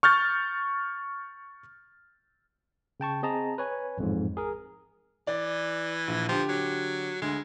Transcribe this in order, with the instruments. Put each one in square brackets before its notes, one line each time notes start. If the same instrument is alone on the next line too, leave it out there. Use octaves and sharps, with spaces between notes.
[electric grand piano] C#6 F6 G6 A6
[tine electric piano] C#3 G5 A5 C#6
C4 G#4 D#5 A5 A#5
B4 C#5 G#5
A1 F2 G#2
G#4 A#4
[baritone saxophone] E3 [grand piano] D5
[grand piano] A#1
[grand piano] D3 G4 [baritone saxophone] F3
[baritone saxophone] F#3
[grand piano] D2 [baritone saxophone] G#3